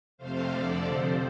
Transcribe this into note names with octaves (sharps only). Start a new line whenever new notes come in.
F2 C3 A3 C5 F5
F2 D3 F3 A4 D5
F2 C3 F3 C5